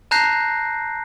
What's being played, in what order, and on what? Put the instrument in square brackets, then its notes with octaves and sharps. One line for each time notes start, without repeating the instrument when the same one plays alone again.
[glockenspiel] A5 A#5 F#6 G6 A#6 C7